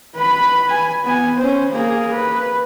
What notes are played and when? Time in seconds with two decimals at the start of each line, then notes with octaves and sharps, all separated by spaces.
0.16 B4 B5
0.70 G#5
1.04 B3 G#5
1.38 C#4 C5
1.72 A#3 G#4
2.14 B4